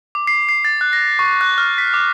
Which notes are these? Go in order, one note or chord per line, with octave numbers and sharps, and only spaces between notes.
D6
C7
C7
A6
F#6
A#6
C#6
F#6
F6
B6
D6